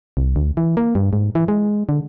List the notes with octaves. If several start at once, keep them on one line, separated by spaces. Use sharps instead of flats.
C2
D2
E3
A#3
G2
G#2
E3
G#3
D3